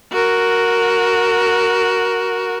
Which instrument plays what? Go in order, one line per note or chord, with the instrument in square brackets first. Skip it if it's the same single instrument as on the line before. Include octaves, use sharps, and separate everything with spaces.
[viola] F#4 A#4